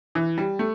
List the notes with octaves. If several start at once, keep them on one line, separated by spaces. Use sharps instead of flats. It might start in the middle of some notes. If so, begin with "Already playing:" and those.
E3
G3
A3